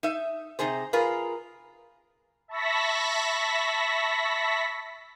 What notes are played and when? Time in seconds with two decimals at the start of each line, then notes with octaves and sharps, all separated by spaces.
0.03 D#4 E5
0.59 C3 D#4 G#4 C5
0.93 F4 G#4 A#4 B4
2.48 E5 A5 B5 C#6 A#6 B6